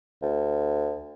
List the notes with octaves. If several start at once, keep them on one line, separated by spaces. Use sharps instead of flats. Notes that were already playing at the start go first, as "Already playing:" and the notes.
D2